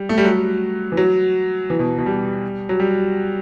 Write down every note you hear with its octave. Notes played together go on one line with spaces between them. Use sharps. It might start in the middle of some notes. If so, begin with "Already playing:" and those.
Already playing: G3
A3
G3
F#3
E3
F#3
E3
B2
B2
G3
F#3
G3